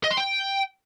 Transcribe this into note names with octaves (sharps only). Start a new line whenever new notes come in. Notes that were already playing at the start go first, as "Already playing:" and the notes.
D#5
C6
G5